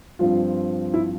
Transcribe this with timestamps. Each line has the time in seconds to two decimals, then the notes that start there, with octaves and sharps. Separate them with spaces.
0.19 G2 F3 C4 F4
0.94 E4